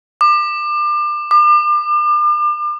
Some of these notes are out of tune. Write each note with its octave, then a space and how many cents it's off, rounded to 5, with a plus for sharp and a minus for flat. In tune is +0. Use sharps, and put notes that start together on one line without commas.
D6 +30
D6 +40